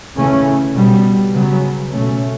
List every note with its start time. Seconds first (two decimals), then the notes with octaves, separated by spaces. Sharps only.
0.17 C#3 E3 A3 C#4
0.74 B2 G3 B3
1.33 C#3 F#3 B3
1.92 B2 A3 C#4